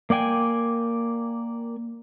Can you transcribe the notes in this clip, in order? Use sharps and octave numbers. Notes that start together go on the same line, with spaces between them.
A#3 D5 G5 G#5